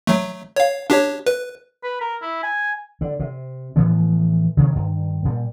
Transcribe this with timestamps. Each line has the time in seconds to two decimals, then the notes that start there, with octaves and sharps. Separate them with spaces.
0.07 F#3 A3
0.56 C#5 F5
0.90 D4 G4 C#5
1.26 B4
1.84 B4
2.01 A#4
2.21 E4
2.43 G#5
3.01 D3
3.19 C3
3.76 A2 E3 F3 B3
4.57 C3 D#3 F#3 A#3
4.74 G2 D#3
5.25 A#2 G3